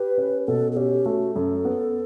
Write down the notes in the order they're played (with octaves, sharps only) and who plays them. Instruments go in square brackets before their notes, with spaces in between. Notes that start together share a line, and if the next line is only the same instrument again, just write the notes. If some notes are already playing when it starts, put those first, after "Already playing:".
Already playing: [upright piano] G4 [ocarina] B4
[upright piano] C#4
[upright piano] B2 [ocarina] A4
[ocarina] A4
[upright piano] C#4 [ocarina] G4
[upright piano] A3 [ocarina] F#4
[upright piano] F#2 [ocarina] A4
[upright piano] B3